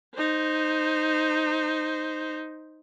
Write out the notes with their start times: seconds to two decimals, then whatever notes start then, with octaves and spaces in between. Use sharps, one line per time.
0.15 D#4 C5